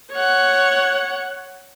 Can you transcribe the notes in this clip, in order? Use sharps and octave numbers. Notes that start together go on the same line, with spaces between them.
C#5 F#5